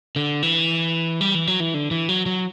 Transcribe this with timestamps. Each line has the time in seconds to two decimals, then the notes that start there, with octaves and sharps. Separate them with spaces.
0.16 D3
0.43 E3
1.21 G3
1.35 E3
1.47 F#3
1.60 E3
1.74 D3
1.91 E3
2.09 F#3
2.26 F#3